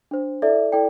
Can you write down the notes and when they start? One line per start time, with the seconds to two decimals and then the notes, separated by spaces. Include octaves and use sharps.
0.11 D4 C5
0.42 E4 A4 D5 E5
0.72 E4 A4 D5 G5